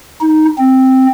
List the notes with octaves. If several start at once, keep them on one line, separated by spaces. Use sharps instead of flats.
D#4
C4